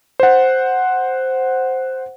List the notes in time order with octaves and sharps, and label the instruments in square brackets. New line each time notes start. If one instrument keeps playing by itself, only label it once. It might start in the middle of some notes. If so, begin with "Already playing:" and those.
[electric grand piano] C5 F#5